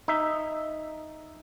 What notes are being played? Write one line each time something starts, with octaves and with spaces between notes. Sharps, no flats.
D#4 E5